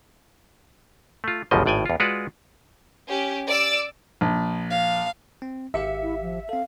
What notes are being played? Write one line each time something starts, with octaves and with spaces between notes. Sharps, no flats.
A3 F4
G1 C#2 F#2 B2 F3 D#5
G#1 A2 D5 G5 G#5
E2 F4
G#3 F4 F#4 B4 D5
C#4 G4
D5 D6 E6
A#1
F5
C4
G#1 G4 E5 F5 C#7
E4
F3
C4 A4 F5